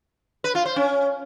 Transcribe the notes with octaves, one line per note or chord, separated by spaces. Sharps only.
B4
F4
C5
C#4